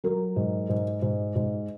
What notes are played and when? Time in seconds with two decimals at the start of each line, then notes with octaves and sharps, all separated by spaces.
0.04 F#3 A#4
0.36 G#2
0.69 G#2
1.02 G#2
1.35 G#2